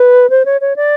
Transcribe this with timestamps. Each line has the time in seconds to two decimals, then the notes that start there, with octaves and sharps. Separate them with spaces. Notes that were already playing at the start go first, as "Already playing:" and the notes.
Already playing: B4
0.30 C5
0.45 C#5
0.61 C#5
0.76 D5